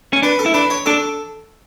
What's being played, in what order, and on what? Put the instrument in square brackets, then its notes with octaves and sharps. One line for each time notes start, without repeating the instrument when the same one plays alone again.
[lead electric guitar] C#4
[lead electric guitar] D4 [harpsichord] B4
[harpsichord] A4
[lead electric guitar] E4
[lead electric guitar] D4 [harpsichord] B4
[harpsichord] C#5
[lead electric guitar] D4 [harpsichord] A4